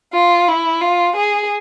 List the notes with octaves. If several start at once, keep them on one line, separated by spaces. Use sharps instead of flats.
F4
E4
F4
G#4